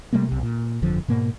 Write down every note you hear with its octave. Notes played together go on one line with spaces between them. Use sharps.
C3 G3 A3 A#3
B1 C3
A#2
G1 F2 D3 F3
G#2 B2 A#3